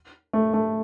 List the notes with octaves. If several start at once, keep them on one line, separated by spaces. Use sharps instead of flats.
A3
A3